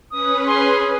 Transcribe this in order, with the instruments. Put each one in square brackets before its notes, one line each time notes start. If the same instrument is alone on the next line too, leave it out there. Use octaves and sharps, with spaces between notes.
[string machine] C#4 B4 [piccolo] D#6
[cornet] G#4 [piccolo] C6